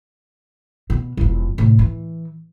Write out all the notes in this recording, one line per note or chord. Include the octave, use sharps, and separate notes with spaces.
B2
E1 F2
A2 C3
E3